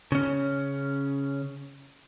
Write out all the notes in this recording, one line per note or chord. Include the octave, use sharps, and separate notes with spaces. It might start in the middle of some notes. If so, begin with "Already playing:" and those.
C#3 C#4